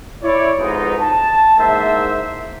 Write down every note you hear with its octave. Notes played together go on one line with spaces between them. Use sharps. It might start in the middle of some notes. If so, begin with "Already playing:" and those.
E4 C#5 D5
F2 G#2 B2 G#3 B3 D#4
A5
E2 G#2 A#3 C5 E5